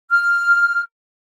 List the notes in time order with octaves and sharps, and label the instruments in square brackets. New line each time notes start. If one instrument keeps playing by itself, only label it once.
[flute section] F6